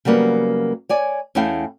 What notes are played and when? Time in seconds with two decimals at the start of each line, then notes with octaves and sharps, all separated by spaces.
0.05 C#3 F#3 G3 A#3 B3
0.89 C#5 D5 G#5
1.35 E2 A3 C#4 E4 F5 G5